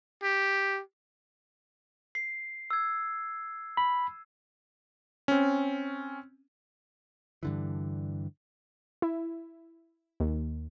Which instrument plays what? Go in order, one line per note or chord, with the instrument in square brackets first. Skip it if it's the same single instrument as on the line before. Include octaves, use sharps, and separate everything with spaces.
[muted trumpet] G4
[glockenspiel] C7
E6 G#6
[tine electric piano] B5
[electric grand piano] C4 C#4
[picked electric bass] G2 D3 E3
[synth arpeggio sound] E4
D#2